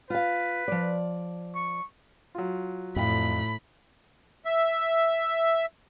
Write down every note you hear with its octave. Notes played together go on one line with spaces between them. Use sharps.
F4 B4 F5
F3 D5
C#6
F#3 F4
F2 A2 B5
E5